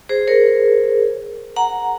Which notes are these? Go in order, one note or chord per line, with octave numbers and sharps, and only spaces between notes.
G#4 C5
A#4 C#5
F#5 A#5